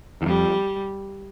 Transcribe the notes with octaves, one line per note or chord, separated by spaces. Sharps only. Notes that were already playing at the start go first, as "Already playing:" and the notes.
E2
F2 G3